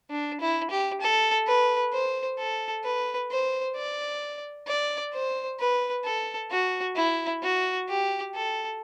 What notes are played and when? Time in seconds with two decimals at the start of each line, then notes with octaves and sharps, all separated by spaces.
0.11 D4
0.41 E4
0.71 G4
1.01 A4
1.47 B4
1.93 C5
2.38 A4
2.84 B4
3.31 C5
3.76 D5
4.67 D5
5.14 C5
5.60 B4
6.05 A4
6.51 F#4
6.96 E4
7.43 F#4
7.89 G4
8.35 A4